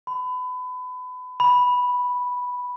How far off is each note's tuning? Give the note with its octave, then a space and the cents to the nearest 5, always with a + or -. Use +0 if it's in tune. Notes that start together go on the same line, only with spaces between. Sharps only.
B5 +30
B5 -5